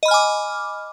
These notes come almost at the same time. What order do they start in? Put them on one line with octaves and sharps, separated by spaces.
D#5 B5 F6 G#5 D6